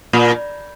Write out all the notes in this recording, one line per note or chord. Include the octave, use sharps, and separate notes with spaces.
A#2